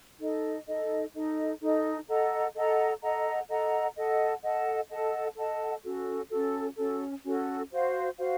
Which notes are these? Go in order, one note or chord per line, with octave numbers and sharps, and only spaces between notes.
D#4 A4 D#5
D#4 A4 D#5
D#4 A4 D#5
D#4 A4 D#5
A4 D#5 F#5 A#5
A4 D#5 F#5 A#5
A4 D#5 F#5 A#5
A4 D#5 F#5 A#5
A4 D#5 F#5 A5
A4 D#5 F#5 A5
A4 D#5 F#5 A5
A4 D#5 F#5 A5
C#4 F#4 A4
C#4 F#4 A4
C#4 F#4 A4
C#4 F#4 A4
F#4 C5 F5
F#4 C5 F5